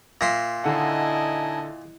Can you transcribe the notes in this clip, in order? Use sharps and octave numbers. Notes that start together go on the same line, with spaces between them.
A#2 E5 C6 A#6
D3 D#4 E4 D#5 F#5 G#5 A5